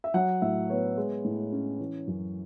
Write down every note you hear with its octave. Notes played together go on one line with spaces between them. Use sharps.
E5
F#3 F#5
A2 E5
B3 C#5
G#3
A2
C#4
E3
F#2